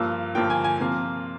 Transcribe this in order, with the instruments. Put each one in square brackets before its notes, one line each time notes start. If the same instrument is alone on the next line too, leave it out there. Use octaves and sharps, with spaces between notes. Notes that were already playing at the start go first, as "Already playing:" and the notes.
Already playing: [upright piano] G2 F3 A#3 F4 E6
G2 F3 A#3 F4 G5
G#5
G#5
C3 F3 A#3 F4